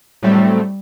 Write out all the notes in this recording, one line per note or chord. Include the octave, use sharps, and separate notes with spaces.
A2 F#3 G3 A3 C4